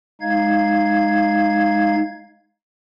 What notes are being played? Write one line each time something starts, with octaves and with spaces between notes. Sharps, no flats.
G#3 D#4 F5 G#6